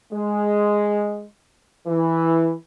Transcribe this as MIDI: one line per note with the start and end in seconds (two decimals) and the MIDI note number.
0.13 1.25 56
1.87 2.52 52